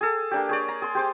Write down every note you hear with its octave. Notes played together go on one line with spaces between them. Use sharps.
G#4 A4
A#3 D4 G4
G#4 C#5 D5
A#5
G#4 C6
G4 C5 D6